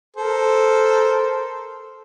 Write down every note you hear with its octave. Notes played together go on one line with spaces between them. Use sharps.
A4 A#4 C5